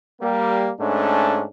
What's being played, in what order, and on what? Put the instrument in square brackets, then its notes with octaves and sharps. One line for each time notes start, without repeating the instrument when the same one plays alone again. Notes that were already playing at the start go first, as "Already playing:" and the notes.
[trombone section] G3 A#3
G#2 A3 C#4 D4